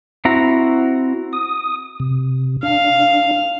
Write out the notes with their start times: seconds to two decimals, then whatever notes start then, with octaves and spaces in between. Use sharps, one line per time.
0.25 C4 E4 F#4 A#5
1.33 D#6
2.00 C3
2.63 D4 F5